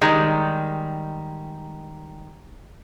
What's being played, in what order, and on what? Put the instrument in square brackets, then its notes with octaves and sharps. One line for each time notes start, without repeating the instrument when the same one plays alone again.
[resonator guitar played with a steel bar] D#3 G3 G#3